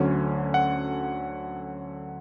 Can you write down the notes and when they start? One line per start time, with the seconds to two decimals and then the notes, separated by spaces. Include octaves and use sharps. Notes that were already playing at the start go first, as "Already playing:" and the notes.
Already playing: D2 D3 F#3 C#4
0.54 F#5